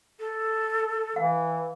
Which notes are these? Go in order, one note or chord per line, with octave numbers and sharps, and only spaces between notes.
A4
E3 F5